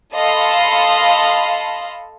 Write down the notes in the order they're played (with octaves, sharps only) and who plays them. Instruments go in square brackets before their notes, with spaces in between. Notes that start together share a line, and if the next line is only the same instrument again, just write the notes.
[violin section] A4 D#5 F5 A5 B5 C6